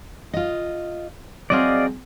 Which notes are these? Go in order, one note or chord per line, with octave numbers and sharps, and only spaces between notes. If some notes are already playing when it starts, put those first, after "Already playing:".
F4 D#5
F#3 C4 G#4 D5 D#5 F5